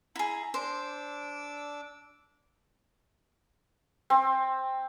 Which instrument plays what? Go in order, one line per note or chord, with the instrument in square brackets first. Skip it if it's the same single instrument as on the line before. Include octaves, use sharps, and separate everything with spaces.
[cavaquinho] E4 G#4 [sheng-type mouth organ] A#5
[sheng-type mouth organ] D4 D6 E6 [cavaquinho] C5
[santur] C4